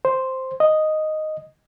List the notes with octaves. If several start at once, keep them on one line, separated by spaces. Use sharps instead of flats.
C5
D#5